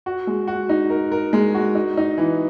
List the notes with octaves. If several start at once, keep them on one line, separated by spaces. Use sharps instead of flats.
F#4
G#3
F#4
D#4
A#4
A#4
G#3
F#4
D#4
D#4
E3